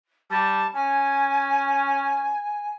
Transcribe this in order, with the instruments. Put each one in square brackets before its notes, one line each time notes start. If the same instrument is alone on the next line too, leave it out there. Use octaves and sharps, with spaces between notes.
[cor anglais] G3 [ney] A5
[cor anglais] C#4 [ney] G#5